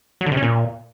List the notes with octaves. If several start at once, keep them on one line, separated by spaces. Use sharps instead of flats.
F#3
D3
C3
C#4
A#2